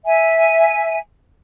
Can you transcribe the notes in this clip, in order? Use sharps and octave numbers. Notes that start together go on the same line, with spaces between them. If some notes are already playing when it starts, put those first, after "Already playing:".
E5 G#5